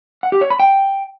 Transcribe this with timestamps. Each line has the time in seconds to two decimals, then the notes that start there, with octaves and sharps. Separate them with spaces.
0.23 F#5
0.32 G4
0.41 C#5
0.50 B5
0.60 G5